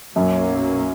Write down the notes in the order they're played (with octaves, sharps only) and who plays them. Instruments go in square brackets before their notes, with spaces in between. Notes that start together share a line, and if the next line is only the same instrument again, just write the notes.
[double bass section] B1 B2 F#3 A#3 C#4 [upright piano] F#2